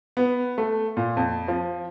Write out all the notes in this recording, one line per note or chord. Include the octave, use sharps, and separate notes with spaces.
B3
A3
A#2
F2
F3